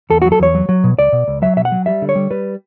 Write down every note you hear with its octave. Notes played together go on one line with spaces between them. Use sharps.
E2 A4
F#3 F#4
A4
E2 C#5
F#3
F#3
B2
C#2 D5
B2
C#2
F#3 E5
B2 E5
F#5
F#3
G3 E5
D3
C#5
G3
G3 B4